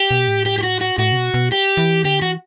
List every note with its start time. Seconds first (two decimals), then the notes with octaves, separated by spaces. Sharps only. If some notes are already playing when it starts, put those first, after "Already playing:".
Already playing: G4
0.11 B2
0.28 A2
0.46 G4
0.58 G4
0.63 F#4
0.81 F#4
0.98 A2 F#4
1.12 C3
1.17 B2
1.34 B2
1.52 G4
1.77 E3
2.04 D3 G4
2.21 E3 F#4